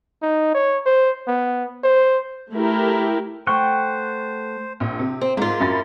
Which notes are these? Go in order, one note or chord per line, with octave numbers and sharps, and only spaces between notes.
D#4
C#5
C5
B3
C5
A3 E4 G4 A#4
A3 C5 F#5 G5 C#6
A#1
C3
C4
G#2 A#3 F4
F#2 B5 A6